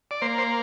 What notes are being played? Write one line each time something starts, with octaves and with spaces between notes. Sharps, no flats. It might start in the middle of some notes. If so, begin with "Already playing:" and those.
D5
A#3 C5
C5